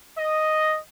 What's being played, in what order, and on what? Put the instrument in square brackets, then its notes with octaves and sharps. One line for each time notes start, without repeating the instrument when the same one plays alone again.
[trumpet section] D#5